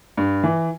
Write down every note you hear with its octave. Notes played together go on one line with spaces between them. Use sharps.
G2
E3